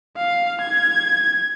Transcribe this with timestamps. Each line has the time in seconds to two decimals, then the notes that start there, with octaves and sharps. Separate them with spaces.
0.17 F5
0.61 G#6